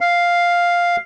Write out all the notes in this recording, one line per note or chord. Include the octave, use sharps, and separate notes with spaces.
F5